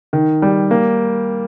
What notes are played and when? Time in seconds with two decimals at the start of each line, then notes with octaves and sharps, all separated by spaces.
0.13 D#3
0.42 G3
0.71 A#3